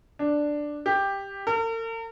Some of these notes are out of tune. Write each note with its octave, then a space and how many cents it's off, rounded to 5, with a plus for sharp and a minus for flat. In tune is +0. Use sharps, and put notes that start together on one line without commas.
D4 +5
G4 +10
A#4 -45